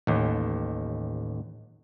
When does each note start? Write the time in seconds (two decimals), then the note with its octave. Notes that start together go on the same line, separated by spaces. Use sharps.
0.07 A1 D#2